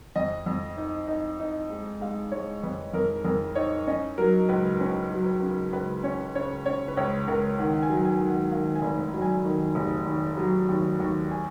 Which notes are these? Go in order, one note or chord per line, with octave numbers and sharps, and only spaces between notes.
F2 D#5
F2
D#4
D#4
D#4
G#3
G#3 F5
G#3 C#5
F2 B4
F2 A#4
F2 A#4
D#4 C#5
C#4 D#5
F#3 A#4
C#2 B4
C#4 B4
F#3
B4
C#3
C#2 B4
C#4 C#5
C#3 C#5
C#3 C#5
B4
C#2 C#5
C#2 A#4
D#3 F#5
G#5
F#3
G#5
D#3
F#5
D#3 F5
G#5
F1
F#3
G#5
D#3
F1
D#2
F#3
D#2
D#2
G#5